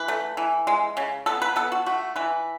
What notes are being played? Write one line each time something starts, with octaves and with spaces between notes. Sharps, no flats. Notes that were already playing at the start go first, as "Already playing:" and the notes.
Already playing: E3 B4
A3
E3
G#3
C#3
B3 A4
B4
B3 A4
F#4
A3 F#4
E3 B4